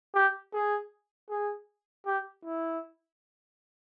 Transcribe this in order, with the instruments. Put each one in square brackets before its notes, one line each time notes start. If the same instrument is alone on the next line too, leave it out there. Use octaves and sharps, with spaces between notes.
[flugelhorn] G4
G#4
G#4
G4
E4